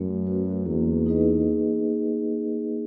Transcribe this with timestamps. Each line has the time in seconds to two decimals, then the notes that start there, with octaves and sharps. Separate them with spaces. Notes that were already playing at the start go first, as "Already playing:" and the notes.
Already playing: F#2 A3
0.26 C#4 F#4 B4
0.66 E2 A#3
1.06 D#4 G#4 B4 D#5